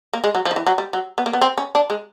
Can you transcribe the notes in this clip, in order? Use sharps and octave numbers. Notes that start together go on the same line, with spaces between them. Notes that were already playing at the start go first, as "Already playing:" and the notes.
A#3
G#3
F#3
F3
D#3
E3
F#3
G3
F#3
B3
A#3
B3
C4
C#4
D4
G#3